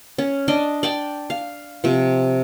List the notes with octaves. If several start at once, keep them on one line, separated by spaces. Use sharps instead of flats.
C#4
D4 D5 D#5
D5 G5 A5
F5
C3 F3